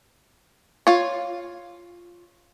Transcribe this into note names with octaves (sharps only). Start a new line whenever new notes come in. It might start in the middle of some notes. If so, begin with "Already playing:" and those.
F4 C#5